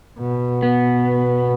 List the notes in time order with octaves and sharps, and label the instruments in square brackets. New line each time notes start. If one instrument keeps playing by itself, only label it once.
[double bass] B2
[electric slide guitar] B3